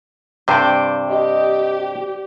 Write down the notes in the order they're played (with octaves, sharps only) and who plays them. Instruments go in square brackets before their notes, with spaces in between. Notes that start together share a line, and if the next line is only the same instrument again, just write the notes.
[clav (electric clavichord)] G2 C3 [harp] C5 D5 G5
[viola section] G4 [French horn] D#5